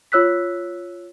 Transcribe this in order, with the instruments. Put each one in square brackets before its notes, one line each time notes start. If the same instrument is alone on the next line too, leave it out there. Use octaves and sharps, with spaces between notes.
[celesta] F4 C#5 E6 F#6 B6